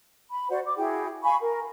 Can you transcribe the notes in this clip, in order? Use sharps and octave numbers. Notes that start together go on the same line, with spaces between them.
B5
F#4 C5 D5 F#5
D6
E4 F#4 G#4 G5
F5 G#5 B5 C#6
A#4